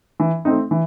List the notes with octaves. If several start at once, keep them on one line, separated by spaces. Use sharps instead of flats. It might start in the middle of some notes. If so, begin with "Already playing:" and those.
E3
A3 C4 D#4
E3